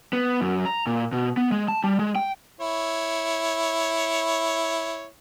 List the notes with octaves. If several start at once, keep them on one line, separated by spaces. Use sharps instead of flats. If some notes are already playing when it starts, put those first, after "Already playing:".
B3
F#2
A#5
A#2
B2
B3
G#3
A5
G3
G#3
G5
E4 C#5